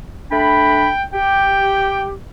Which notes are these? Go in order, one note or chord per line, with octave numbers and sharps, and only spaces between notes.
A3 D4 G5 B5
G4 G5